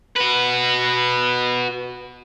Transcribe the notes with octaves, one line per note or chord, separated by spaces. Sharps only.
F#4 B4